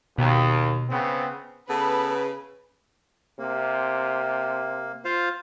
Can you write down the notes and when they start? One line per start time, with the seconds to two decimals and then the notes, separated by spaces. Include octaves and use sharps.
0.18 D#2 B2
0.89 C#3 B3 C4
1.69 C#3 B3 A4 B4
3.39 C3 A#3
5.05 F4 C5 F5